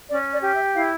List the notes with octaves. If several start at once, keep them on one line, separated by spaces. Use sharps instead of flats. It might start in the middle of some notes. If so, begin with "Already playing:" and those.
C#4 D5
D5
G4
E5
E4 F5